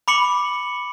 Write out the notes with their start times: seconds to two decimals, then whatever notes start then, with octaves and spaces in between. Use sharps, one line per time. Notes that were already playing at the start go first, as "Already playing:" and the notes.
0.08 B5 D6 C#7 F#7